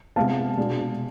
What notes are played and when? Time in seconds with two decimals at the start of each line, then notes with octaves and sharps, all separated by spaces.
0.16 C3 G#3 B3 F5 A5
0.58 B2 G#3 D4